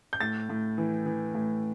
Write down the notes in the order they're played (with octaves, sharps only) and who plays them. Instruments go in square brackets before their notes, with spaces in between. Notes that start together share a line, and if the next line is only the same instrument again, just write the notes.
[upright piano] G6
A2 A6
A2
E3
E3
A2